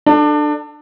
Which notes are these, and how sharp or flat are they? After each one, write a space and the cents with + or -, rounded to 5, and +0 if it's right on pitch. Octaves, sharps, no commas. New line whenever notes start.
D4 +25 A4 +0